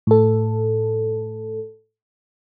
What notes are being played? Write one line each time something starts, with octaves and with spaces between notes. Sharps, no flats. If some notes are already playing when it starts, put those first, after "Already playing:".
A2 A4